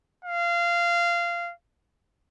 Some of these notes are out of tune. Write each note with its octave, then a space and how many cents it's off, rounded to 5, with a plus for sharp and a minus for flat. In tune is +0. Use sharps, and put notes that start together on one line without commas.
F5 -20